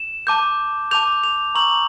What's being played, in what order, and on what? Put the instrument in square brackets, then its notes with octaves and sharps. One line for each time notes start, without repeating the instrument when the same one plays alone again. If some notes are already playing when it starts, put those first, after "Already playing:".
Already playing: [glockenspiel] E7
A5 D6 G6
A5 D6 G6 F7
F7
A#5 C#6 E6 G6 F#7